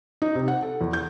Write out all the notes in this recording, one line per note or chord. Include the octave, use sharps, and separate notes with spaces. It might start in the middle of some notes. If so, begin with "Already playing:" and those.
D#4
C3
F#5
A4
E2
G6